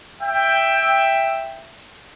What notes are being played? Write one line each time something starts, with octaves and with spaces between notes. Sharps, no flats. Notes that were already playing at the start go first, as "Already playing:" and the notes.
E5 G5